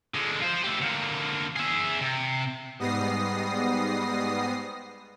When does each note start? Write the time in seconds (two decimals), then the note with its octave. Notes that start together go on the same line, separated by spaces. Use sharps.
0.14 D3 G#3
0.42 F4 C5
0.64 A3 G4
0.81 D3 A#3
1.56 G#4 E5
2.02 C3
2.79 G#2 G3 B3 D#6 A#6 C7